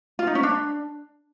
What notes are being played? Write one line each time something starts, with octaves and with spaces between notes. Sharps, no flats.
F4
D#4
C#4
D4